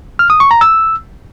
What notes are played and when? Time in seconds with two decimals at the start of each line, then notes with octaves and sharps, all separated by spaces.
0.19 F6
0.30 D#6
0.40 C#6
0.51 A#5
0.61 E6